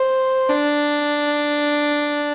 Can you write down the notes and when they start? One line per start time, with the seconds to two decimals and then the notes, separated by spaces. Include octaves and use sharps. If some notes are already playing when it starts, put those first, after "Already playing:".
Already playing: C5
0.50 D4